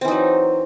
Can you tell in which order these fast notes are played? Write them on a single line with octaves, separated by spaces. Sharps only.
C4 E3 D#4 F#3